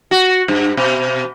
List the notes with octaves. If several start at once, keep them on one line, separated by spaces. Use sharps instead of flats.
F#4
G2
B2